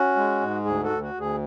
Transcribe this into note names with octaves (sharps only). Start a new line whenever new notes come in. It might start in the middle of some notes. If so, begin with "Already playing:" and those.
Already playing: C#4 F#4
G#3
G#2
D2 G#4
F#4 A4
D2
F#4
D2
G#4